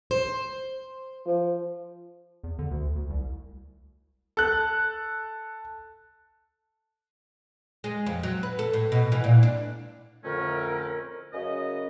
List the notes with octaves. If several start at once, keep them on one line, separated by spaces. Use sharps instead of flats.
C5
F3
E2
D3
D2
D2
C2
A4 F#6
G#3
F2
F#3
B4
A4
A2
B2
E3
A#2
D4
F2 A2 D3 A3 C#4 A#4
F#2 C#3 C#4 D#5